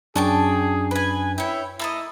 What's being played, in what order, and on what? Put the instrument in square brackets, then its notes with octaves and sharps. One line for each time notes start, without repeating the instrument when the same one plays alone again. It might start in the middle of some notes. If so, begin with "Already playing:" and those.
[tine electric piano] F#2 D4 [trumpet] G#4 [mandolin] G5 A5 C#6
[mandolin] B4 G#5
[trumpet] E4 [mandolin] C#5 G5
[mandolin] A#3 A4 D#5 [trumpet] E4